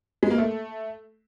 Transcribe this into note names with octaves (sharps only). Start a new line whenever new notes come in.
G#3
A#3
A3